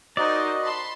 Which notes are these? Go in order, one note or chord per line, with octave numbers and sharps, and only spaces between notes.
D#4 F#4 A#4 C5 D5 D#5
A5 B5 C6